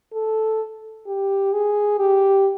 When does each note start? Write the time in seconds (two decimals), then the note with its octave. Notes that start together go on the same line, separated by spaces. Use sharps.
0.13 A4
1.07 G4
1.53 G#4
1.99 G4